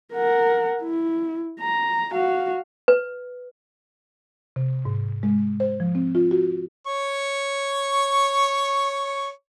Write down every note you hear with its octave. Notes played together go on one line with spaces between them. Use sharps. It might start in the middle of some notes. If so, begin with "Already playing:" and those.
A#4 F#5
E4
A#5
F#4 F5
B4
C3
G#2
G#3
C5
F3
C4
F4
F#4
C#5 C#6